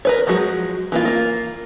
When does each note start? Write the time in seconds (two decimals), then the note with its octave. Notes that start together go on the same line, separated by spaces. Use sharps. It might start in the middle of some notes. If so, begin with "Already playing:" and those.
0.05 A#4 B4 C#5
0.27 F3 F#3 G#3 F#4
0.92 E3 A#3 F4
1.05 A#3 F4